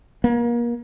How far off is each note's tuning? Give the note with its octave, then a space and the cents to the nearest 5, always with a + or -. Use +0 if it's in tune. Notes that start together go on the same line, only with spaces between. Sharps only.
A#3 +30